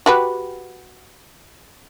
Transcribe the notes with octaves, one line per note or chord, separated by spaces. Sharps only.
F#4 G4 B4